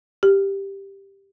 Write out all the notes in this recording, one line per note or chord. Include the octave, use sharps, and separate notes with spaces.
G4